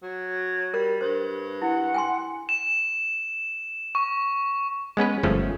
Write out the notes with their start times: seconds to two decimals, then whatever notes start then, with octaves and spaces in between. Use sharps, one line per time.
0.03 F#3
0.74 G3 A#4
1.01 G2 C5
1.62 E4 F#5
1.94 G5 G#5 C6
2.49 E7
3.95 C#6
4.97 G#3 B3 C#4 B4
5.23 G1 F3 A3 C#4 G#4